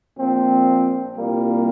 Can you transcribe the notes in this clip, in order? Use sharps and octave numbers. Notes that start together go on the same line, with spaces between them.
A#1 A#2 F3 C4
C2 A#2 G3 A#3